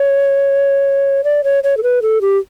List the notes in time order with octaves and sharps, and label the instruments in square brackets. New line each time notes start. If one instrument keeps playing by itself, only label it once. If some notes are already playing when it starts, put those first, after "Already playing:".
Already playing: [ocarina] C#5
D5
C#5
C#5
A4
B4
A4
G4